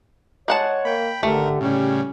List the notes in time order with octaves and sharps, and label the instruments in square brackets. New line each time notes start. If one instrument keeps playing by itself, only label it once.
[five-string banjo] G#3 F#5 A5 [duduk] C#5
[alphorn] A#3 [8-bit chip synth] G5 B5
[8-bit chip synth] G#1 A#4 [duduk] D3 [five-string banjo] A3 [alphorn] G4
[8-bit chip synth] A2 C#3 G3 [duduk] C#4